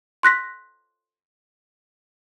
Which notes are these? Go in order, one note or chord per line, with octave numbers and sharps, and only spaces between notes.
C6 F#6 A#6 B6